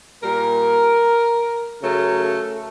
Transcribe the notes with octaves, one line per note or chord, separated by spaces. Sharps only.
A#2 G3 A#4
C#3 F#3 A3 A#4
A4